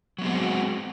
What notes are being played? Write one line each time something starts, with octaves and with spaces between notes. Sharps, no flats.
F#3 G#3 B3 C4 F#4